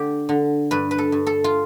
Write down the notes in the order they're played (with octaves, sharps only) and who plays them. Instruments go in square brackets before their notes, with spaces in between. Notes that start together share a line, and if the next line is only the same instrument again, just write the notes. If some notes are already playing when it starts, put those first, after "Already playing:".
Already playing: [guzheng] D3 G4
D3
G2 B4
B4
A4
G2
A4
F4